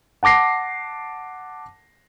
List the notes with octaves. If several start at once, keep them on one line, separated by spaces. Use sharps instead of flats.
F#5 A5 D6 A#6 C7